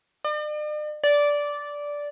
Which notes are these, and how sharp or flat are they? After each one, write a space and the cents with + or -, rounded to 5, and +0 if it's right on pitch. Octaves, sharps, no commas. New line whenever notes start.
D5 +45
D5 -10